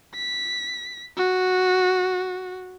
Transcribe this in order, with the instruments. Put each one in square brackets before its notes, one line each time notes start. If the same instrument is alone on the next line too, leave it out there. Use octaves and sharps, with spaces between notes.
[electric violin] B6
F#4